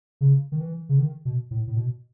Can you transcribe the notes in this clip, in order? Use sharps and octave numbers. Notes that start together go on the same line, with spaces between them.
C#3
D#3
E3
C#3
D#3
B2
A2
A2
B2